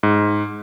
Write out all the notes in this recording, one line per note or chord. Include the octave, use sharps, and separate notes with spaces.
G#2